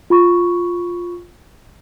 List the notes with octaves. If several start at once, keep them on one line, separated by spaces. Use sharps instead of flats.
F4 B5 C#6